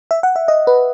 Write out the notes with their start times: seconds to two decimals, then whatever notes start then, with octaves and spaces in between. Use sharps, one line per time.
0.11 E5
0.23 F#5
0.36 E5
0.48 D#5
0.67 B4